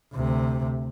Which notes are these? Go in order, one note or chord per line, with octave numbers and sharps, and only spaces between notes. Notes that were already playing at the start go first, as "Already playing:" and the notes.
D2 C3